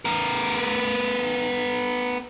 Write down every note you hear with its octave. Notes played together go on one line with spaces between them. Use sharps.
B3 A#4